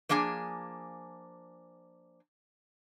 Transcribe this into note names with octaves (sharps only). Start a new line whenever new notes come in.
F3 A#3 D4 G#4 G#5